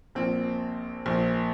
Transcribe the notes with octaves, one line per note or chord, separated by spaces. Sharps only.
A#1 A#2 C4
A#1 A#2